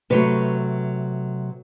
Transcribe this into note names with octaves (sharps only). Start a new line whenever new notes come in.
C3 F#3 A3 B4